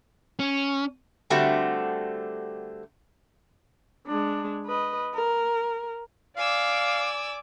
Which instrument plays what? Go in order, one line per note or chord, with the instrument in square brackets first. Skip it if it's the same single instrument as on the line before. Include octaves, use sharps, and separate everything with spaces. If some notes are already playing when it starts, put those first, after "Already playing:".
[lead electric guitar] C#4
[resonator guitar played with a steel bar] D3 G3 A3 C4 F#4 G4
[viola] G#3 D4
B4 D#5
A#4
[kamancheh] D5 D6 [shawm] F5 [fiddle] G#5 E6